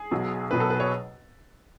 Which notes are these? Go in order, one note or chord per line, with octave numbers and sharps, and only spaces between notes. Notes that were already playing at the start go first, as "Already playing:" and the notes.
Already playing: G#4
B1 B2 F#3
B1 B2 F#3 B4
A4
B4
C#5